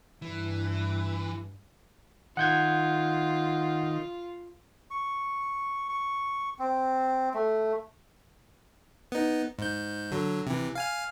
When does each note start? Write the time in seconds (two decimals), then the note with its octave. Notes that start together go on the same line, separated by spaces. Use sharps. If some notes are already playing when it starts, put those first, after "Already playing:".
0.22 G2 E3
2.37 D#3 F4 F#5 G6 G#6
4.91 C#6
5.89 C#6
6.59 C4
7.34 A3
9.12 B3 D#4
9.59 G#2 G6
10.11 D3 F#3
10.47 C3 E3
10.75 F5 G#5 F6